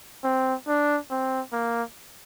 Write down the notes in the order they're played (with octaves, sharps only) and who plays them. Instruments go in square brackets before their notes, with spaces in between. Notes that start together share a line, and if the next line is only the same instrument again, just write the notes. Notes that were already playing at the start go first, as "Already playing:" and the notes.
[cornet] C4
D4
C4
A#3